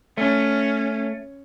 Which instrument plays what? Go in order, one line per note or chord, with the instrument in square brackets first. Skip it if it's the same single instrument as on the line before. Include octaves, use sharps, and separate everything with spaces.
[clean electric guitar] A3 [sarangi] C#4